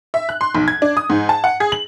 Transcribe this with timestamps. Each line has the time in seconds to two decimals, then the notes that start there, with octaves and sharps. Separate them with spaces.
0.14 E5
0.29 F#6
0.41 C6
0.55 B1
0.68 G#6
0.82 D4
0.97 D#6
1.10 G#2
1.29 A5
1.44 F#5
1.60 G#4
1.72 F#7